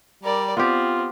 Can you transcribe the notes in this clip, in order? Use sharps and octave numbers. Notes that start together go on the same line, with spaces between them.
G3 A#4 D5
B3 C4 F4 G4